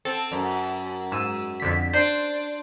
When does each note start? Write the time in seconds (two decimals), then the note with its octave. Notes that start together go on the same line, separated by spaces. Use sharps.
0.05 C4 A4
0.32 F#2
1.12 G#2 E6 D#7
1.60 F2 D3 B6
1.93 D4 C5